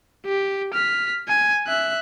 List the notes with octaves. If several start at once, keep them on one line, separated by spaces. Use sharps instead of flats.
G4
F6 B6
G#5
E5 F#6